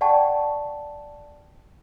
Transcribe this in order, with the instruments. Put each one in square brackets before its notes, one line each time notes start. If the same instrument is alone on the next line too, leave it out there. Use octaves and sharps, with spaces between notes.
[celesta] D5 F#5 G5 A5 C#6